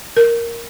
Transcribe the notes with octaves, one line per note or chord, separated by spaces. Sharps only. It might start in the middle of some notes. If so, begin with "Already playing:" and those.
A#4